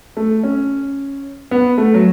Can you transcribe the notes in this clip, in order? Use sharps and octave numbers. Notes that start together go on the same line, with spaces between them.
A3
C#4
B3
A3
F#3